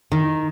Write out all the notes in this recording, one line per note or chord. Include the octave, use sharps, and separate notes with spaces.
D#3